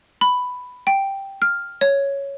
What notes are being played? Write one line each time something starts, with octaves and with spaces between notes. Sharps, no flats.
B5
G5
F6
C#5